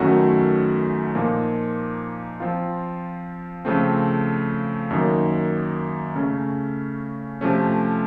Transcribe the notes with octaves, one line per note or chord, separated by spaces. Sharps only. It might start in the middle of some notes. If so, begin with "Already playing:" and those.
Already playing: F#2 D#3 A3 C#4 F#4
A#2 F3 A#3 D#4
F3 C4 F4
C#3 F3 A3 C4
F#2 D#3 A#3 D#4
C#3 A3 C#4
C3 F3 A3 C#4